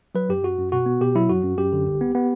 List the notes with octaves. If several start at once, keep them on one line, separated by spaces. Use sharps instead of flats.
F#3 B4
F#2 G4
F#2 F#4
F#2
B2 F#4
B3
B2 G4
F#3 E4
F#2 F#4
F#2
F#2 G4
D3
C2
B3
B3